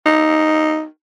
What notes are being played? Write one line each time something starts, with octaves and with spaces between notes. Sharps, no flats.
D#4